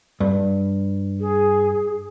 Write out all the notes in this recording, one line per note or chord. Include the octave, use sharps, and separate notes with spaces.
G2
G#4